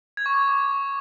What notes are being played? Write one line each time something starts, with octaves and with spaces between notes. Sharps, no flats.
G#6
C#6
D6